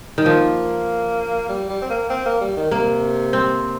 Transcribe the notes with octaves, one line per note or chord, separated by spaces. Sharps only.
D#3
F3 A#3
G3
G3
C4
A#3
C4
A#3
G3
D#3
C3 A#3
C4